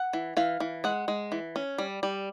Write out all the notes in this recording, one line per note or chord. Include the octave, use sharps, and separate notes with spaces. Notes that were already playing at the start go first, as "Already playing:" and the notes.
Already playing: F#5
E3
E3 F5
E3
G#3 F#5
G#3
E3
C#4
G3
G3